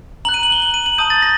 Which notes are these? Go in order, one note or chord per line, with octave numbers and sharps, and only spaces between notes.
A#5 F#6 F#7
D#7
F#7
G7
F#7
D#7
F#7
A5 D#6 G6 D#7
A6
A#6